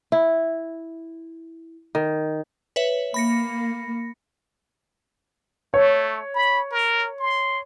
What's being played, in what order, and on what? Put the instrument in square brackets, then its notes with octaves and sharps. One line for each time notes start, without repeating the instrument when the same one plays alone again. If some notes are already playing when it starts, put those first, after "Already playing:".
[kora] E4
D#3
[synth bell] B4 C#5 E5
[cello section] A#3 [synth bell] B5 A#6 C#7
[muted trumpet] A3 [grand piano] C#5
[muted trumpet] B5
A#4
C6